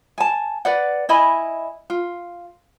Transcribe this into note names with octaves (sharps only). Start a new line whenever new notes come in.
G#5 A5
B4 D5 F#5
E4 D#5 G#5 B5
F4